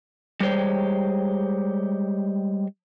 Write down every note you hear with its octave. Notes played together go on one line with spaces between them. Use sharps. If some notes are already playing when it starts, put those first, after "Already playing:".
G3 G#3 G4 C5 C#5